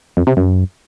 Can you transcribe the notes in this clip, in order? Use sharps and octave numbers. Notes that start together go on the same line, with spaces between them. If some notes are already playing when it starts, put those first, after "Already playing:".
F2
C3
F#2